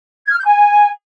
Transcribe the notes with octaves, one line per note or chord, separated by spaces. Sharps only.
G#6
F6
G6
G#5